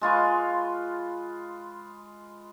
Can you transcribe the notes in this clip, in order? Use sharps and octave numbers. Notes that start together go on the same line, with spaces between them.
G#3 F4 B4 C#6